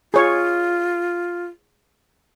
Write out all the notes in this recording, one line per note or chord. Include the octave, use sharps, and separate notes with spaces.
F4 G#4 C#5 C#6